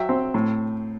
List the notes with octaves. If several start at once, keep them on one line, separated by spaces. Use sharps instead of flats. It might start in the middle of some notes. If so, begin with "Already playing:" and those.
Already playing: F#3 E5 G5
C4
A2